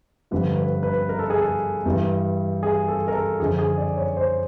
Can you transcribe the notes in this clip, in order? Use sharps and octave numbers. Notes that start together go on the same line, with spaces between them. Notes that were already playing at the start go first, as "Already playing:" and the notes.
G2 D3 F3 B4
B4
B4
A#4
A4
G#4
A4
G2 E3
G#4
A4
A#4
A4
F#2 D3 F3 G#4
G#4
D5
C#5
C5